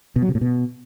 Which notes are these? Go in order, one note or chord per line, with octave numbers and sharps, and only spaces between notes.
B2
F#3
C3
A2
B2